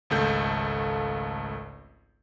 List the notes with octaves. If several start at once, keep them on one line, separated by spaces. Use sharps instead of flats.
G#1 C#2 A3 G6